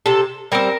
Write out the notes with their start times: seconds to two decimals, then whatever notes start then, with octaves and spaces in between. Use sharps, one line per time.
0.06 C3 A4
0.52 G3 C4 A#4